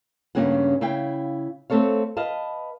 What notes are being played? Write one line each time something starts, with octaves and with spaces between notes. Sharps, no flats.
G2 C#3 A#3 C#4 G#4 F#5
C#3 E4 F5 G5 G#5
A3 C4 A4 C#5 F5
B4 D#5 F5 A5